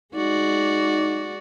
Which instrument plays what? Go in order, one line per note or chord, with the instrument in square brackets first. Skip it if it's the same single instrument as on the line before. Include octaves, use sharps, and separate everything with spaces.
[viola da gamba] G#3 F#4 D5 [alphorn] D#4